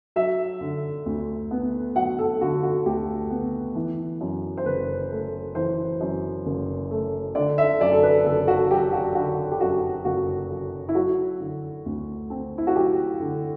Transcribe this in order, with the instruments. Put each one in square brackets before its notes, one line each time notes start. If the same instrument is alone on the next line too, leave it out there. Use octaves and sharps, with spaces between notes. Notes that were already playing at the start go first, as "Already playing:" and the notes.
[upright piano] F#3 E5
D3
D2
B3
F#3 F#5
A4
D3 F#4
F#4
D2 G4
B3
E3
F#2
C5
F#1 B4
A3
E3 C5
F#2
F#1
A3
D3 D5
E5
F#2 D5
A4
B4
F#1 A4
F#4
F#3 G4
F#4
D3 F#4
G4
F#2 F#4
F#1 F#4
F#3
E4
F#3 F#4
D3
D2
C4
E4
F#4
F#3 G4
D3